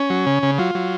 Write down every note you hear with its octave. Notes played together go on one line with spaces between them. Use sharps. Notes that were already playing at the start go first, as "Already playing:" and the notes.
Already playing: C#4
F#3
C#3
C#3
F#3 F4
F#3